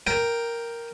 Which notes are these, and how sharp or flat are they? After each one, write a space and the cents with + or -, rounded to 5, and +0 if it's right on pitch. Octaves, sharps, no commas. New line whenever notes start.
A#4 +0 G5 +0